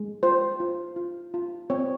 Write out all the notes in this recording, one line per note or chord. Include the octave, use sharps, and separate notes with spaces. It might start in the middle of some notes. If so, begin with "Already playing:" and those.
Already playing: G#3
F4 C5
F4
F4
F4
C4 C#5